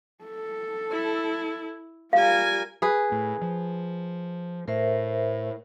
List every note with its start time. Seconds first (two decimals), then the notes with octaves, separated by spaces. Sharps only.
0.24 A4
0.91 E4
2.13 G3 F4 A#4 F5 G#5
2.82 G#4 B4
3.12 A2
3.42 F3
4.68 A2 A#4 C5 E5